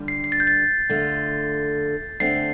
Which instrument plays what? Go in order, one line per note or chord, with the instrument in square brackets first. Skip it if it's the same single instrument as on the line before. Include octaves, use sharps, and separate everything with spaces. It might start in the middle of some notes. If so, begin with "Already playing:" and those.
Already playing: [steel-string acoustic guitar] D3 G3 D4 F4
[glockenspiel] C7
C7
A6
G6
A6
[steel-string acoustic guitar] D3 A3 F4
[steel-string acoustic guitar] D3 A3 C4 [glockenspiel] C7